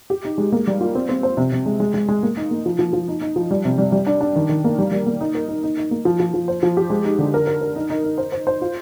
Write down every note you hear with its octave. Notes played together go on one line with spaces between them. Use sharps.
G4
D#4
G#3
A#3
G3
F4
C4
C4
C5
C3
C3
G#3
G#3
G#3
G#3
A#3
D#4
A#3
F3
F3
F3
D#4
D#4
F3
G3
C3
G3
G3
D4
D4
D#3
D#3
A#3
G3
G3
A#3
D#4
A#4
D#4
D#4
D#4
A#3
F3
F3
F3
C5
F3
G4
G#3
D#4
D3
A#4
A#4
A#4
D#4
D#4
D#4
C5
C5
C5
F4